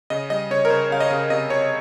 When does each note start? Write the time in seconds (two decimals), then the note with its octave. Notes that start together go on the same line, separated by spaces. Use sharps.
0.10 C#3 D#5
0.30 G3 D#5
0.50 C#3 C#5
0.65 A#4
0.70 C#3 C5
0.90 C#3 F5
1.00 D#5
1.10 C#3
1.30 C3 D#5
1.50 C3 C#5